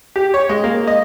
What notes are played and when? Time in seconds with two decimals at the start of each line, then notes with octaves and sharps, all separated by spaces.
0.16 G4
0.34 C#5
0.49 G#3
0.64 A#3
0.87 D#5